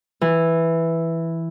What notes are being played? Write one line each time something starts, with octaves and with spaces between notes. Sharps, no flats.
E3